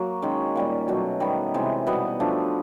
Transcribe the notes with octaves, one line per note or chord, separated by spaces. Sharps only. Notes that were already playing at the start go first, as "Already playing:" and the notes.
Already playing: F#3 A#3 F#4
D#3 G#3 C#4
A#2 G3 A#3
B2 F#3 A3
D#3 G3 B3
C3 E3 G#3
B2 G3 B3
F3 A3 D4